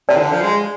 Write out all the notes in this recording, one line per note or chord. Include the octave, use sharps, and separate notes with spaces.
C3 D5
E3
D3
F3
G#3